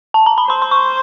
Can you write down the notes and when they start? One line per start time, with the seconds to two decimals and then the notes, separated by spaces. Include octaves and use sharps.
0.14 A5
0.26 A#5
0.38 B5
0.50 C5 C6
0.62 C6
0.71 C#6